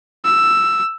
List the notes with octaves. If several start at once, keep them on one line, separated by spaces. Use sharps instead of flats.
E6